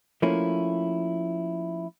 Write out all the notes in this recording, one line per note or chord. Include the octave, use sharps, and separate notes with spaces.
F3 A3 A#3 C#4 E4